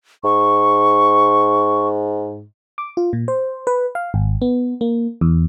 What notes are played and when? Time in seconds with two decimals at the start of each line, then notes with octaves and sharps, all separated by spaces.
0.24 G#2 C#6
2.78 D6
2.97 F4
3.13 A#2
3.28 C5
3.67 B4
3.95 F5
4.14 G#1
4.42 B3
4.81 A#3
5.21 E2